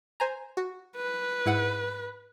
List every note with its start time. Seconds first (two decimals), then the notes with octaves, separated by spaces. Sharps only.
0.20 C5 G#5 A#5
0.57 F#4
0.96 B4
1.46 G#2 E4 F#5